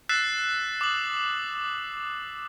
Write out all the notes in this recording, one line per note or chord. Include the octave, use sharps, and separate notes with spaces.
E6 F#6 A6 B6 C7 E7
D6 D#6 F#7